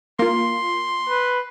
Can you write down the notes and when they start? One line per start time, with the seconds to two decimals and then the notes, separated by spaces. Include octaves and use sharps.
0.19 A#3 F4 C6
1.09 B4